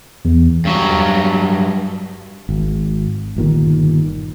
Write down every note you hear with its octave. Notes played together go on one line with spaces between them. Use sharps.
E2
G2 F#3
G#1
G1 A#2 D#3